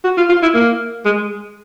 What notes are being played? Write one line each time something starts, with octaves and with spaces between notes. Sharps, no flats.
F#4
F4
F4
E4
A#3
G#3